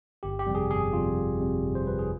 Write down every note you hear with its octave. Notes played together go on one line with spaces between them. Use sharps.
G1 G4
G4
F2 C3 G3
G#4
G1 G#4
F2 C3 G3 F4
G1
F2 C3 G3
G1
C5
F2 C3 G3 B4
G#4